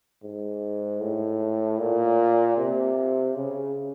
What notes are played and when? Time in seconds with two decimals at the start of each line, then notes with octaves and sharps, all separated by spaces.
0.23 G#2
1.02 A2
1.80 A#2
2.57 C3
3.35 C#3